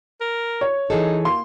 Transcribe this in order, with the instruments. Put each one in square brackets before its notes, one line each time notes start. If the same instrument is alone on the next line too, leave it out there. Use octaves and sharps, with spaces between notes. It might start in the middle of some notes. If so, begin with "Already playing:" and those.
[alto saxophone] A#4
[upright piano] C#5
[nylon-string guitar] E3 G#4 A4 [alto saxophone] D#4
[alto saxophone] A#3 [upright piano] C6